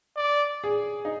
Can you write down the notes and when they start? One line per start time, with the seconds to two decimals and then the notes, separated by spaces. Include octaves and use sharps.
0.16 D5
0.64 G#4
1.05 D#4